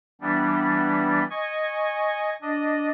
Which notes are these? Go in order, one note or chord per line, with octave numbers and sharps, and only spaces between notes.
E3 G3 B3 D4
D#5 G#5 C#6
D4 D#5